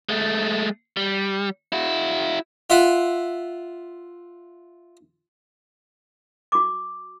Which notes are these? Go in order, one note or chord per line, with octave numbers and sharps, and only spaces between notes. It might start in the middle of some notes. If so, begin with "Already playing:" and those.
G#3 A3
G3
E4 F#4
F4 E5 F#5
F#4 D6